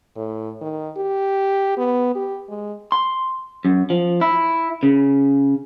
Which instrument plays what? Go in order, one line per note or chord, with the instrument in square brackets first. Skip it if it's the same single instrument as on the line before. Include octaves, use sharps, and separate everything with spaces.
[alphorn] A2
D#3
G4
B3
G4
G#3
[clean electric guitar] C6
F#2
F3
E4
C#3